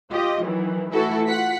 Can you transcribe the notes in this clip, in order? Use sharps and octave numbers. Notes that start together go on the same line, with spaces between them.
F4 G4 D#5
D#3 E3 F#3
E3 A3 E4 F#4 A4
F4 F#5 B6